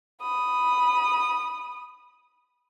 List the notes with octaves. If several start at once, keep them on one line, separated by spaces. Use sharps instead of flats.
B5 D#6